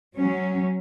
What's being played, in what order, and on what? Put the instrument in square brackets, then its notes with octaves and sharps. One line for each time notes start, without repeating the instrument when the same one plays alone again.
[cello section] F#3 C#4